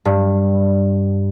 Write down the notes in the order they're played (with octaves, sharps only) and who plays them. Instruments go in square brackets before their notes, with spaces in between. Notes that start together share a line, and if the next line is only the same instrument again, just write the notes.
[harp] G2